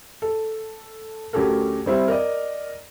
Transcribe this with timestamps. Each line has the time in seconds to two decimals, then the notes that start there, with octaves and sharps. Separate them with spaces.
0.22 A4
1.33 D2 F#3 C#4 G4 A4 A#4
1.86 G3 C4 E4
2.08 A#4 D5 D#5